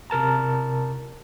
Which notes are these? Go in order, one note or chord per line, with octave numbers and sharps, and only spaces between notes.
C3 A#4 A5 A#5